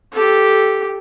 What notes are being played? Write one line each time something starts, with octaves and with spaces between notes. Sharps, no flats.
G4 A4